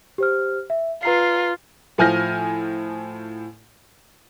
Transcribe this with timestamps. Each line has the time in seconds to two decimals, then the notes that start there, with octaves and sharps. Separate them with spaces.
0.18 G4 C5 F6
0.70 E5
1.03 F4 B4 A#5 C7
1.98 A2 F3 G#5 F6 G6 A#6